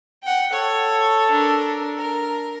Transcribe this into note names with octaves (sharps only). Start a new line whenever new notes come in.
F#5 G5
A4 C#5
D4 A#4
A#4